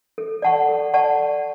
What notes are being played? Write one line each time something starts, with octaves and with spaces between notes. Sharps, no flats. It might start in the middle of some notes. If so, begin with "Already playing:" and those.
A4
D5 F#5 A5 C#6
A4
D5 F#5 A5 C#6